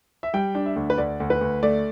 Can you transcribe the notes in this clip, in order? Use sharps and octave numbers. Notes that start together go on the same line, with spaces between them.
E5
G3 G5
D4
E5
D2
B4
D2 D5
D2
B4
D2
A3 D5